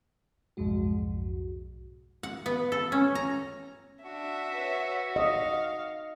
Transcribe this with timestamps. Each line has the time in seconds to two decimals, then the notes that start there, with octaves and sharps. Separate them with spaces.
0.57 B1 F2 G#2 G#3 F#4
2.23 F#5
2.46 B3
2.72 A4
2.92 C#4
3.15 A#5
4.05 D4 F#4 E5
4.54 B4 C#5
5.16 D#5 F5